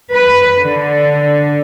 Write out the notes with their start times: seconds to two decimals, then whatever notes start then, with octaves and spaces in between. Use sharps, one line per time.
0.12 B4
0.60 D3